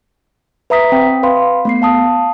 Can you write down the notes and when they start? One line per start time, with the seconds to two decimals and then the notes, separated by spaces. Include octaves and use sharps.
0.70 B4 E5 A#5 D#6 B6
0.92 C4 G5
1.23 B4 F5 B5 C6
1.65 A3 B3 C7
1.82 F5 A5 D#6